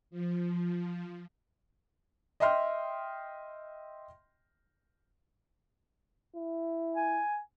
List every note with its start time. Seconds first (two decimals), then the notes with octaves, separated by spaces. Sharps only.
0.10 F3
2.40 D#5 E5 G5 C6 F6
6.36 E4
6.95 G#5